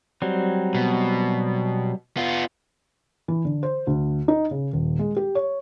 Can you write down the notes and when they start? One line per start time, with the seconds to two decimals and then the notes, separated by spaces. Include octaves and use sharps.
0.22 F#3 G3 C4
0.75 B2
2.17 B3 F4
3.28 E3
3.45 D3
3.63 C5
3.87 D2
4.28 D#4
4.51 C#3
4.73 D#1
4.99 G#3
5.16 G4
5.35 C#5